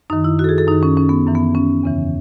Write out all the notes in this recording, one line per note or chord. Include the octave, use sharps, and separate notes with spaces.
F#2 D#3 D#4
E4
F#4
A4
G#4
A4
F#2 D#3 D#4
C#4
C#4
B3
F#2 E3
B3
C#4
E2 C#3 E3